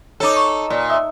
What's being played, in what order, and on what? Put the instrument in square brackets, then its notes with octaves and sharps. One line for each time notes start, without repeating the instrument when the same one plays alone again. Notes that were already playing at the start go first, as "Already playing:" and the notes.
[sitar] D#4 A4 [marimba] C#5 D6
[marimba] C#6
[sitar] A#2
[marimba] E5 D#6 E6